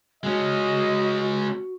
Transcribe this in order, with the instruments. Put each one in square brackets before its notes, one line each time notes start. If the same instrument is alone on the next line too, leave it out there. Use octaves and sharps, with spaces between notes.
[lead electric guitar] G#3 C#4 [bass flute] F#4 [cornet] D#5